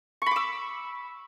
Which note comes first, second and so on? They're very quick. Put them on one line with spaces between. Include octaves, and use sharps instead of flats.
C#6 B5 D6 E6